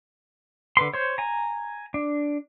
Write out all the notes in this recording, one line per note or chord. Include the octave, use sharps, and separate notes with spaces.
D3 B4 C6
C5 C#5
G#5 A#5
D4